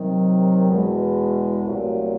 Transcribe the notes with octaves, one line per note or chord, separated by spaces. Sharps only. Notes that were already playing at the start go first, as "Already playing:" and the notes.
Already playing: C3 D#3 F#3
E2 B2 G#3
C2 A#2 F#3 A3